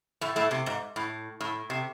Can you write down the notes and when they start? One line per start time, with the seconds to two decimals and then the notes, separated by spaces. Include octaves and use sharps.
0.21 A2 A3
0.36 A2 A3
0.51 C3
0.66 G#2
0.96 A2
1.41 A2
1.70 C3